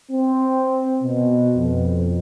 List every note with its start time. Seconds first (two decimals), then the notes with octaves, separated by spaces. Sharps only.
0.11 C4
1.02 B2
1.56 F2